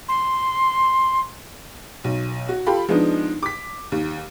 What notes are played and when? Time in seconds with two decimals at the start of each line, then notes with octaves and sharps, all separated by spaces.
0.09 C6
2.04 B1
2.49 F#4
2.67 F4 G4 A4 B5
2.89 F3 G#3 B3 D4 D#4
3.43 D6 B6
3.92 D#2